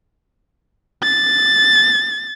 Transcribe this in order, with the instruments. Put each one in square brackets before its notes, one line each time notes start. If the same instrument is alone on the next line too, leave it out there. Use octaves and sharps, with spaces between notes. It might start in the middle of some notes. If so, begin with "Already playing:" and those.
[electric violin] A6